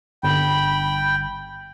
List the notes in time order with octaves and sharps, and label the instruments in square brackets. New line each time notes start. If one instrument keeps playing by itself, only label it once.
[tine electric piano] G1 [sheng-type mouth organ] G5 [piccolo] B5